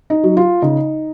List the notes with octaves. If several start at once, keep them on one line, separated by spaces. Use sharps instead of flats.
D#4
F#3
F4
C#3 D#4